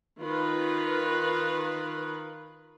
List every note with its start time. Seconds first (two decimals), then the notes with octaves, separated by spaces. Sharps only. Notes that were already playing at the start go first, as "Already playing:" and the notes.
0.20 D#3 F4 B4